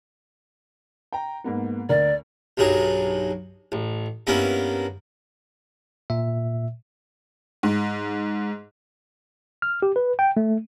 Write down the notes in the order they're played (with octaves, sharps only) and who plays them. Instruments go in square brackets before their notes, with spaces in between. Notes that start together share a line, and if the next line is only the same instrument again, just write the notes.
[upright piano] G5 A#5
G#2 A#3 B3
[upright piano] D2 A#4 [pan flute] D5
[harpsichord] B1 G2 F#3 G#4
A1
G2 A#3 B3 C#4 E4
[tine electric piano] A#2 E5
[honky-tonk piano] G#2
[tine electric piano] F6
G4
B4
G5
A3